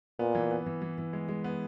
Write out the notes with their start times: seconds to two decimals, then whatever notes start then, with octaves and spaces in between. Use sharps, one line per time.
0.19 A#2 B3
0.35 E3
0.51 B3
0.66 E3
0.82 E3
0.98 E3
1.13 G#3
1.28 G#3
1.44 B3